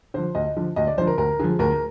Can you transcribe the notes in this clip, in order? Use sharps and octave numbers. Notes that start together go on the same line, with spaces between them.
D3 F3 C5
D2 D#5
D3 F3
D2 D#5
D5
D3 F3 C5
A#4
D2 A#4
D3 F3 G#4
D2 A#4